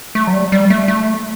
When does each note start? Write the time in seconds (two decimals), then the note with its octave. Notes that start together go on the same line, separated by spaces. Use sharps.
0.15 A3
0.27 F#3
0.33 G3
0.52 G3
0.70 A3
0.88 A3